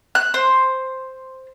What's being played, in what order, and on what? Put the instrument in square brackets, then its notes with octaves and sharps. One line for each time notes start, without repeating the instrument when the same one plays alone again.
[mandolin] F#6
C5